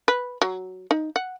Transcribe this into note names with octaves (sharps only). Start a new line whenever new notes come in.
B4
F#3
D#4
F#5